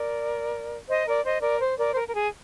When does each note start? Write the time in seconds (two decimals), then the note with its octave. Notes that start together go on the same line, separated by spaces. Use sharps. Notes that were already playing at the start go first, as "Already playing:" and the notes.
Already playing: A#4 D5
0.89 C5 D#5
1.07 A#4 D5
1.24 C5 D#5
1.42 A#4 D5
1.60 C5
1.78 A#4 D5
1.91 C5
1.96 A#4
2.08 A#4
2.13 G#4